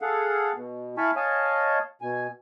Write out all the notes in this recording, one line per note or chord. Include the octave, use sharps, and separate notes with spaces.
G#4 A4 F5 F#5
B2
E4 F5 G#5 A5 B5 C#6
C#5 D#5 F5 G#5 A5
B2 G#5